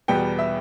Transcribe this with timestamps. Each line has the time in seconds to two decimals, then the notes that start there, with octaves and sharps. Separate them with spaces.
0.08 E2 B2 G3 B3 G5
0.39 E5